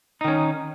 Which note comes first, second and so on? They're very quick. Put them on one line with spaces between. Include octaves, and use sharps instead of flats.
D#4 D#3 C#4